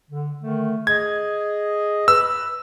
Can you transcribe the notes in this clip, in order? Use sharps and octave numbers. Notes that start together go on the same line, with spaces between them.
D3
D3 D#3 A3
G#4 D#5 G#6
B4 E6